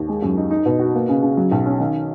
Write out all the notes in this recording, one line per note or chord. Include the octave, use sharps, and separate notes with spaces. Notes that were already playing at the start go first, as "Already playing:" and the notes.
Already playing: D#2
G#3
F#2
D#4
D#4
B2
F#4
A#3
C#3
C#3
F#3
B1
C#4
D#3